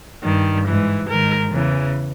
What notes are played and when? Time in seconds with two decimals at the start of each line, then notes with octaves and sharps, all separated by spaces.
0.23 G2 D#3
0.65 G#2 E3
1.08 G#2 D#3 A#4
1.52 E2 C#3 E3